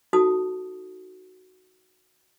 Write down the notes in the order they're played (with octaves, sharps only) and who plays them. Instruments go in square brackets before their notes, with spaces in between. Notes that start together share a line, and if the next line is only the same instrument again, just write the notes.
[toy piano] D#4 F#4 A4 A5 D#6